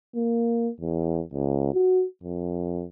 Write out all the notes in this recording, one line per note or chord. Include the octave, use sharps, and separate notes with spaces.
A#3
E2
C#2
F#4
F2